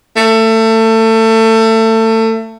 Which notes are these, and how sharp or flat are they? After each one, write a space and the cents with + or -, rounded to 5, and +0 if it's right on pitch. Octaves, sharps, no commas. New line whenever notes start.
A3 +25